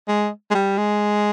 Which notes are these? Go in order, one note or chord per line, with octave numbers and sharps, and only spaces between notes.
G#3
G#3
G3
G#3